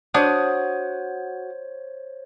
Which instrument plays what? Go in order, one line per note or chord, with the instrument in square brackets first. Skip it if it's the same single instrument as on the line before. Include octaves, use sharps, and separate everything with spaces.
[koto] D4 [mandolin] F#4 D#6 [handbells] C5 C#5